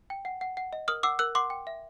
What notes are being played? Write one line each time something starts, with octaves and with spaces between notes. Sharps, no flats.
G5
F#5
F#5
F#5
D#5
A#4 D#6 F6
F#5 D6 E6
A#4 E6 F#6
F#5 C6 D6
G5
E5